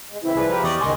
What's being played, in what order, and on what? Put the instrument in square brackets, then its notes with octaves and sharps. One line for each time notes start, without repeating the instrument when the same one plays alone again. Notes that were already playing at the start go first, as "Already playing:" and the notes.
[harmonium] G#3
[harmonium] C#3 E3 C4 [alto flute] E4
[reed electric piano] C2 G#4 D5 [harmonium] F3 B4
[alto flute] G4 [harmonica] A#4
[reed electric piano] E2 [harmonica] D5 D#5 C#6
[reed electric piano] C#2 G#5 [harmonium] G#2 D#3 [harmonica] D#5 C6 C#6